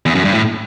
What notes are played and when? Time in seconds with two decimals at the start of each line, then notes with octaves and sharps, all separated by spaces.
0.06 E2
0.15 F#2
0.24 G2
0.34 A2